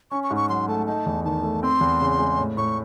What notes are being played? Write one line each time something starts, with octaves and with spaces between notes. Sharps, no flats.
C#4 C#6
C#6
G#2
C#6
F#3 C6
A3 A5
D#4 A5
E2
D#3 A5
A3
C4 C6
E2
C#3
G#3
A2
A2 C#6